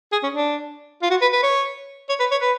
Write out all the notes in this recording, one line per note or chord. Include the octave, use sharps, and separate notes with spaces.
G#4
C#4
D4
F4
F#4
B4
B4
C#5
C#5
B4
C#5
B4